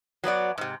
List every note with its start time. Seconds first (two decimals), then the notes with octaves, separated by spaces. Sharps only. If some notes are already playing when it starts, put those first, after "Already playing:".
0.24 F#3 B3 F#4 D5
0.58 G#2 C3